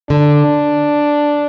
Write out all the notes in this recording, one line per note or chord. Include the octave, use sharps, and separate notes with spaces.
D3 D4